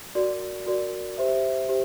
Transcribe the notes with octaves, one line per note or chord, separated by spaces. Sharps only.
F#4 A#4 D5
F#4 A#4 D5
G4 C5 E5
G4 C5